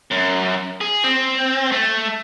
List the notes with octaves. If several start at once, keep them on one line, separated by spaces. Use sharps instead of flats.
F#2
G#4
C4
A3